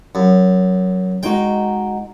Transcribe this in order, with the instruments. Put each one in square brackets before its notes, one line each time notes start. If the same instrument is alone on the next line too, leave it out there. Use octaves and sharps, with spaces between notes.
[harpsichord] F#2
[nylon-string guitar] G#3 D#4 F#4 [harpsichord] G5